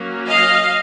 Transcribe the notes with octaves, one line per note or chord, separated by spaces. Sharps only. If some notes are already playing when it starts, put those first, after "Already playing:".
Already playing: F#3 A#3 C#4
D#5 F5